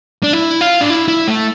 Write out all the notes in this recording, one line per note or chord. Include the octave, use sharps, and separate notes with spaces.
D4
E4
F4
D4
E4
E4
A3